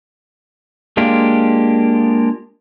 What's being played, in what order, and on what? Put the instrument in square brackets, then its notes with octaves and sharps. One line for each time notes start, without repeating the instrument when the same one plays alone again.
[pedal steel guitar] G#3 A#3 D4 F4 G4